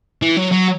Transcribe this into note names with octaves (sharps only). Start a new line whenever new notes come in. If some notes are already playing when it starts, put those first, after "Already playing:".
E3
F#3
F#3